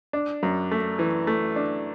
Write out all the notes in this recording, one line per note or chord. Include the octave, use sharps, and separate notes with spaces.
D4
F#2
A3
E3
A3
D4